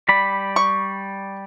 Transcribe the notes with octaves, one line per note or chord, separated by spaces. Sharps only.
G3 D5 B5
C#6